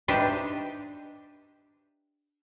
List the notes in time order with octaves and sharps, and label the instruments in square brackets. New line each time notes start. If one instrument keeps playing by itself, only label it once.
[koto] D4 D#4 G4 B4 C5 E5